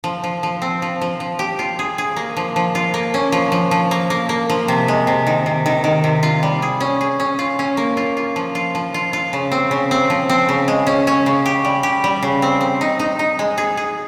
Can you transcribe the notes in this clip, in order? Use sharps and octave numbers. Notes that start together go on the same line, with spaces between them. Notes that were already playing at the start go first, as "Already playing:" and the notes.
F3
F3
F3
C4
F3
F3
F3
G4
F4
G#4
G#4
A#3
F3
F3
F4
A#3
C#4
F3
F3
F3
A#3
A#3
A#3
F3
C3
G#3
C3
D#3
C3
D#3
D#3
C3
F4
G3
G#4
C#4
G#4
C#4
F4
C#4
A#3
F4
F4
F3
F4
F3
F4
F4
C#3
C4
C#3
C4
F3
C4
C#3
G#3
C#4
C#4
C#3
G4
G3
G4
G3
C#3
C4
C4
D#4
D#4
D#4
G#3
G#4
G#4